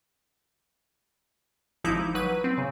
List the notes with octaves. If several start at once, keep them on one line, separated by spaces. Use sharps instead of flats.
G#1 F3 D#4 E4 D6 G6
F#3 B4 D#7
C4
C#3